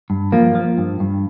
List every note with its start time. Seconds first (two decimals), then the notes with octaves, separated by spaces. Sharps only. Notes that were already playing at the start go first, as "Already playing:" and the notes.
0.10 G2
0.32 F3 A#3
0.55 F3
0.78 G2
1.00 G2